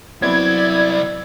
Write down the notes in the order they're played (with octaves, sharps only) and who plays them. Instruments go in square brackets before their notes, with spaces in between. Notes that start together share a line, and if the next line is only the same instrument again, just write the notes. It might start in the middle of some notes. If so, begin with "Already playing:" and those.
[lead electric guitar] C2 D5 [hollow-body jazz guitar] F#3 B3 C4 [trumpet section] E4 [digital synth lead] G#6